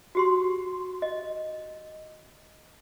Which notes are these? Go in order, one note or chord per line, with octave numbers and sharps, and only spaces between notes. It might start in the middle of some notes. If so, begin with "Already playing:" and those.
F#4 G4 C6
D#5